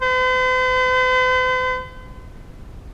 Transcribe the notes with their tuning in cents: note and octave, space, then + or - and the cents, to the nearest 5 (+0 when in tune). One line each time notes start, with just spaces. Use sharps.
C5 -45